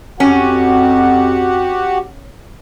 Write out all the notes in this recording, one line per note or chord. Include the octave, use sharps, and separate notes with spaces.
F2 C#4 F#4 G4 F#5